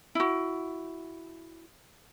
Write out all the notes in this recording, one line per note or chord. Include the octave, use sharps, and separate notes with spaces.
E4 F#4